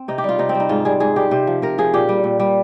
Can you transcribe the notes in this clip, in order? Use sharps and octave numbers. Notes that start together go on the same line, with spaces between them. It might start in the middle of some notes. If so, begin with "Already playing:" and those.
Already playing: C4
C3 D#4
G4
G3 F4
C3 D#4
C4
G3
D#4
G#2 F4
G3 G#4
G#2 G#4
G3 G4
C3 C5
F3
C3 A#4
F3 G#4
A#2 G4
G3
A#2
G3